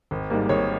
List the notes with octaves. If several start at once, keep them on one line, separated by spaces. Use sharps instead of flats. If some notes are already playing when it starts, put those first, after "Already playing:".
G#1
G#2 G3 A#3
G#1 C#5